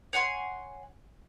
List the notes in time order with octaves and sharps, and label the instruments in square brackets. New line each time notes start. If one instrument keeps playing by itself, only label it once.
[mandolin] C#5 F#5 G#5 C6